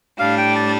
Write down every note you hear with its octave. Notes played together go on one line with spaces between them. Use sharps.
A2 G3 D4 F5
G5
A5